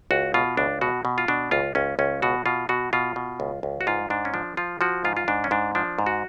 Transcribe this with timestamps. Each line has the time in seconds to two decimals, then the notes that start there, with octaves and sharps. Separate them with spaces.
0.11 C#2 F#4
0.34 B2 F4
0.57 C#2 D4
0.81 B2 F#4
1.05 B2
1.18 F4
1.28 B2 D4
1.51 C#2 F4
1.75 C#2 C#4
1.99 C#2 C#4
2.22 B2 F#4
2.46 B2 F4
2.69 B2 F#4
2.93 B2 F4
3.16 B2
3.40 C#2
3.63 C#2
3.81 F#4
3.87 G#2 F4
4.10 G#2 D4
4.25 C#4
4.34 F3 D4
4.57 F3 F4
4.81 F3 F#4
5.04 G#2 F4
5.17 F4
5.28 G#2 D4
5.44 C#4
5.51 G#2 D4
5.75 F3 D4
5.99 G#2
6.06 F#4